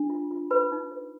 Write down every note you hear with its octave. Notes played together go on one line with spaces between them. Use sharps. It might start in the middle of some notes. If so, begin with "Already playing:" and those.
Already playing: D4
F4
F4
B4 B5
D#4
B4